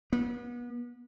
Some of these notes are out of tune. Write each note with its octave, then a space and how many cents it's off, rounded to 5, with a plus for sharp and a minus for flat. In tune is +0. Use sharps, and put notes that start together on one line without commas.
B3 -35